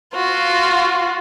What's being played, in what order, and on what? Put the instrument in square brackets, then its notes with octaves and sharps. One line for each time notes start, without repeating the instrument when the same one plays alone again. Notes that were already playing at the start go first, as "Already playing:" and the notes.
[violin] F4 F#4